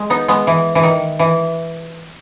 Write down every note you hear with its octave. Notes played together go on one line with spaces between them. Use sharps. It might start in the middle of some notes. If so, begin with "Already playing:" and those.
Already playing: G#3
B3 D#4
G#3 B3
E3
E3
D#3
E3